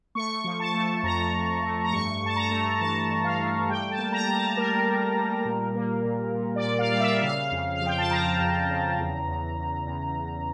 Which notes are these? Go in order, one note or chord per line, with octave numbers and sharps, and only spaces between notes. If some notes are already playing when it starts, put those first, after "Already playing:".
A3 C#6
F3
A5
A3
F2 A#5
F2
A3
A#5
G2 C#6
G2 A5
A#5
A3
E3 A5
G2
F5
A3
G3 G5
A5
A#3
A#5
G3
A5
G3 A#4
G3
G3
A#2
A#3
A#2
A#2
D5
A#2
F5
G3 D5
E5
C#3 F5
F2
F5
F3
G5
A5
F3 A#5
F2
C#3
E2
E2
E2
E2
E2